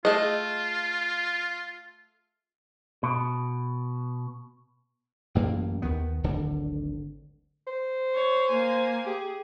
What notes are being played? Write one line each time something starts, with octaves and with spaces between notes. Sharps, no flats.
A3 F4 G#4 D#5
B2
A1 F#2 A#3
D#2 D#3 B3
D1 G#1 D3
C5
C#5
A#3 G#5
G4 G#4